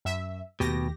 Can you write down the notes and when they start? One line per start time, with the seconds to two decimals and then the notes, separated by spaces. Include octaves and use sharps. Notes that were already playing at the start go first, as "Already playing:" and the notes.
0.05 F#2 E5
0.60 D#2 B2 D#3 A3 G4 A#6